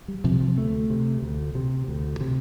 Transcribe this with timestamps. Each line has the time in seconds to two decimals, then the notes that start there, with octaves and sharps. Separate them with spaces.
0.08 G3
0.24 C3 F3
0.41 F3
0.57 D2 A3
0.90 C3
1.22 D2
1.55 C3
1.88 D2
2.21 C3